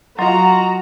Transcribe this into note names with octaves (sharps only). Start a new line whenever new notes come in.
F#3 F4 F#4 D#5 A#5 C6